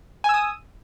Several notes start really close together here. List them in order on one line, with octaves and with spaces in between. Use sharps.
G#5 E6 D#6